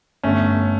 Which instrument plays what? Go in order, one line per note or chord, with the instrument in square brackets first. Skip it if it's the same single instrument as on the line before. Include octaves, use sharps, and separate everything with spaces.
[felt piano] G1 [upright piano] A3 C#4